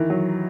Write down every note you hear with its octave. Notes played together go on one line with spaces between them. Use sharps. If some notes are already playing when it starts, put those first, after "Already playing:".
Already playing: D#3 E3
F#3